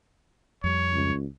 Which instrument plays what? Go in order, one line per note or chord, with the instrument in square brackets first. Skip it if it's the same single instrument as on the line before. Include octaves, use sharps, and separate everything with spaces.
[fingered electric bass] F2 G3 [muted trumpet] C#5
[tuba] C#2